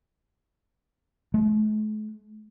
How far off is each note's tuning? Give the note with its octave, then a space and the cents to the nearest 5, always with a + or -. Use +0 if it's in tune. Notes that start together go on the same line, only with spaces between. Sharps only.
A3 -45